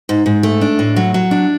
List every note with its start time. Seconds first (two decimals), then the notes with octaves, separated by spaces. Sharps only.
0.09 G#2
0.26 G#2
0.43 A3
0.61 D4
0.79 A2
0.96 F#3
1.14 F#3
1.31 D4